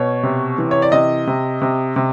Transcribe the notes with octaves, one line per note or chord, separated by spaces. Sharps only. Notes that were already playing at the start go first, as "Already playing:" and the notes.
Already playing: B2 C#5
C3
E3
C#5
D5
C3 D#5
C3
C3
C3